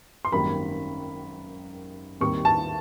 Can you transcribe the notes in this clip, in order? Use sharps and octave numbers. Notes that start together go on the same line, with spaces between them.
C6
G#1 F#2 D#3 G3 A#3 B5
D#2 D#3 G3 C4 C#6
A5